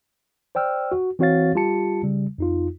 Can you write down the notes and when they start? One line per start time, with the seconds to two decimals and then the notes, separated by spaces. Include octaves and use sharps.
0.55 C5 D5 G5 E6 F6
0.92 F#4
1.19 E3 C4 F#4 C#5 F5 A6
1.54 G3 F4 G4 A5 C#7
2.03 C#3 G3
2.38 F2 D#4 F4